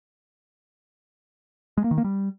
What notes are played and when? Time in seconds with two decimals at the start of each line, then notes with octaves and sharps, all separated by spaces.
1.77 G#3
1.84 A#3
1.91 D#3
1.98 A#3
2.04 G3